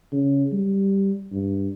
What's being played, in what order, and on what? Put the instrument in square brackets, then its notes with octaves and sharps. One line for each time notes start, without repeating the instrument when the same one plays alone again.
[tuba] C#3
G3
G2